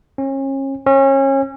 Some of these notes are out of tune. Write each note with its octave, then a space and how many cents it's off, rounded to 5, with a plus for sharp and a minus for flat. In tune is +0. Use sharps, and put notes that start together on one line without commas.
C#4 -35
C#4 -30